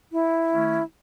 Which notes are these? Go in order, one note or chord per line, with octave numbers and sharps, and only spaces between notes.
E4
D#3 A3 C#4